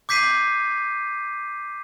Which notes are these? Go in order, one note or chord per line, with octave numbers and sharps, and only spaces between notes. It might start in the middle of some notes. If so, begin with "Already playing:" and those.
D6 G6 B6 C7 D#7